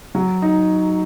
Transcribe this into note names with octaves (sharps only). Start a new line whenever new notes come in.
F#3
D#4